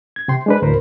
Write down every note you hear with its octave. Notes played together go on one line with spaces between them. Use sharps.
G#6
C3 G5 C6
G#3 D4 B4
D2 A2 A#4 C5 B5